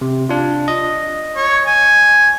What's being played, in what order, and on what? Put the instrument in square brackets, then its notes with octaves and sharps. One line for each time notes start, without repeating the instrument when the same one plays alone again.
[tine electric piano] C3
D4 F4
D#5
[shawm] C#5
G#5